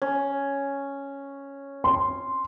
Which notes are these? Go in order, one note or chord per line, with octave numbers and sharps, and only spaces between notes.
C#4
C6